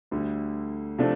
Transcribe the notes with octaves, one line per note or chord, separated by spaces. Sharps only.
D2 D3 G3
C3 F3 A3 D4